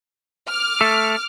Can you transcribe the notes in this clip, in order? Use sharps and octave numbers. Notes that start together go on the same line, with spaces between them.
D6 F6
A3 A4